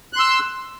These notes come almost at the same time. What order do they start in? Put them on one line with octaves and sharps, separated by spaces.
F#6 C6 E6